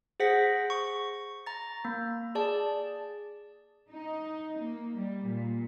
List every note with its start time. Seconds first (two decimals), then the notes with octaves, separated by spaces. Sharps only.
0.20 G#4 C5 F#5 A#6 B6
0.70 C#6
1.46 A#5 A6
1.85 A#3
2.35 G#4 D5 A5
3.92 D#4
4.60 A#3
4.96 G3
5.28 A#2